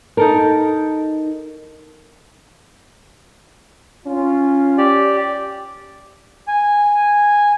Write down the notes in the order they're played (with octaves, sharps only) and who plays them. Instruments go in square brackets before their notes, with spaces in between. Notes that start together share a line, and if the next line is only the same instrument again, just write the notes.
[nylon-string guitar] D#4 A4 A#4
[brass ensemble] C#4 F4
[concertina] G4 D5
[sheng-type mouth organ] G#5